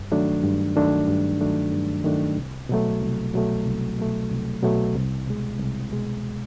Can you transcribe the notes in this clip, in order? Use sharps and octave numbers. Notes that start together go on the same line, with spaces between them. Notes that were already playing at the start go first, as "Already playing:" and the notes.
Already playing: G2
D#3 F#3 A3 D4
G2
D#3 F#3 A3 D4
G2
D#3 F#3 A3 D4
G2
D#3 F#3 A3 D4
C2
B2 F#3 A3
C2
B2 F#3 A3
C2
B2 F#3 A3
C2
B2 F#3 A3
C2
B2 G#3
C2
B2 G#3